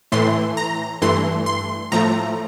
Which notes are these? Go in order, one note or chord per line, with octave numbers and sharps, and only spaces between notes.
A2 E3 A3 C6
A#5
G2 E3 A3 C6
C6
A2 F3 A3 A#5